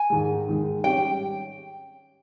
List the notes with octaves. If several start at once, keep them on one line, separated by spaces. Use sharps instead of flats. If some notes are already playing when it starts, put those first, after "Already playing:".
Already playing: G#5
G#2 D#3 G#3
G#2 D#3 G#3
G3 C#4 G4 G5